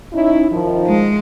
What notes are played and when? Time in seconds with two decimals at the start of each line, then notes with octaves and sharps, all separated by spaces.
0.13 C#4 D#4 E4
0.51 D#3 F3
0.87 G#3